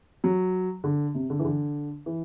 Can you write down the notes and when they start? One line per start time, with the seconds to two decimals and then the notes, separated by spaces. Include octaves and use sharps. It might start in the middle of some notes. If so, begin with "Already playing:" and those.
0.24 F#3
0.84 D3
1.14 C3
1.30 D3
1.39 E3
1.45 D3
2.06 E3